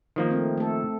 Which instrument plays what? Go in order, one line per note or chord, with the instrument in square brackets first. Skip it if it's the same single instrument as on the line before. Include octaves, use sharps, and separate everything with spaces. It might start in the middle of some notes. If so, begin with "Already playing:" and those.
[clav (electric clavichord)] D#3 F3 A#3
[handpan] A3 C4
A3 A4